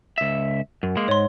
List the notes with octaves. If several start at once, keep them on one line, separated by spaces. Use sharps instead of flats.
C#2 E5
F#2
G#3 A#3
G#2 C#5 C6